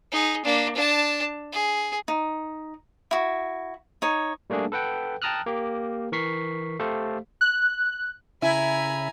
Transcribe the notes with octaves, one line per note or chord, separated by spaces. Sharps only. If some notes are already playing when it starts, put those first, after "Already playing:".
D#4 G#4
A#3 D4
D4 A5
G#4
D#4
E4 F#4
D#4 C#5
G3 A3 A#3 D4 G#4
A4 B4 F#5 G5
G5 A5 A#5 D#6 F6 F#6
A#3 G4
E3 A#4 C#6 B6 C7
A3 G4 A4 C5 F5
F#6
C#3 E4 E5 G#5 A#5 B5